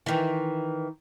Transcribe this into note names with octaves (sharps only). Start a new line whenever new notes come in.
D#3 E3